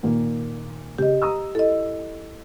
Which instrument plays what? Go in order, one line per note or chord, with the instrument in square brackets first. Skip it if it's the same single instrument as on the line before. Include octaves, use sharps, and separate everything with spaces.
[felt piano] A#2 D#3 A#3
[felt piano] C#3 [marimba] G4 D#5
[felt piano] A#5 D#6 E6
[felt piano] E4 [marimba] A4 D#5